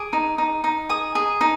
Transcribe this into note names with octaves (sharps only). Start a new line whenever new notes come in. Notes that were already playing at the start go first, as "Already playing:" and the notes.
Already playing: G#4 D6
D#4
D#4
D#4
G#4 D#6
G#4
D#4